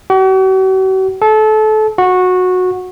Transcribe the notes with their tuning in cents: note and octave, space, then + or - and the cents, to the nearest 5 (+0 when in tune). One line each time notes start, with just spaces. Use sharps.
F#4 +45
A4 -25
F#4 -15